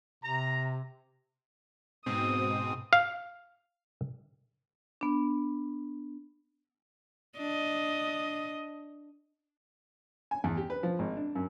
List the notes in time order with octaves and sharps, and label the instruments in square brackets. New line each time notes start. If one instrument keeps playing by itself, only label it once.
[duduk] C3 [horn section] A#5
[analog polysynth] G#2 B2 C4 [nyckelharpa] D#6
[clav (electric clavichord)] F5
[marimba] B3 D4
[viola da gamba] D4 D#5
[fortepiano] G#5
E2
G4
B4
F3
G#1
D4
F#2